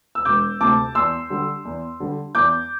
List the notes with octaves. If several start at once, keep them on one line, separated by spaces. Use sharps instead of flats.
E6
E1 D6 G6
D2 C3 A5 D6
E2 C6 E6
D3 G3
E2
D3 G3
E2 D6 G6